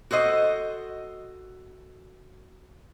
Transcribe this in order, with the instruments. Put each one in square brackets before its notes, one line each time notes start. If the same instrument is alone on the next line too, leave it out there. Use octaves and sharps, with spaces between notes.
[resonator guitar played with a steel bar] F#4 A4 C5 D#5